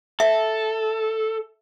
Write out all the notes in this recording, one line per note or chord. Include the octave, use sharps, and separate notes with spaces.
A4 E5